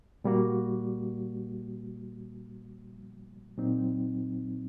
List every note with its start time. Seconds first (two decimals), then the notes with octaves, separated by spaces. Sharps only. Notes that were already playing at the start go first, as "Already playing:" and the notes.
0.24 A#2 G3 A#3 F#4
3.58 A#2 F#3 C4 D#4